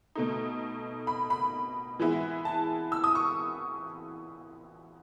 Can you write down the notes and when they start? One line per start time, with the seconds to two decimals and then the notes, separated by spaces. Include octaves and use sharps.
0.15 B2 A3 D#4
1.07 B5
1.30 B5
1.99 E3 G#3 B3 E4
2.45 A5
2.92 E6
3.04 D#6
3.15 C#6